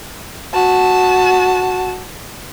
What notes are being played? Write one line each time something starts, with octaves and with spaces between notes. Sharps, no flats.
F#4 A5